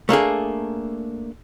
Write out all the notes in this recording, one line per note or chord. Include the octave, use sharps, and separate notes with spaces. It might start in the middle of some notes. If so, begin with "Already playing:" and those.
A3 A#3 D4 G#4